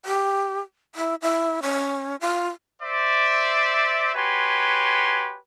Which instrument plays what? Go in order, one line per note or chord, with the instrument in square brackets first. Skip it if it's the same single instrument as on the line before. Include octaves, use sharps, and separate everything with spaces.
[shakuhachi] G4
E4
E4
C#4
F4
[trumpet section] C5 D5 E5
F#4 G4 B4 C#5 G#5 C6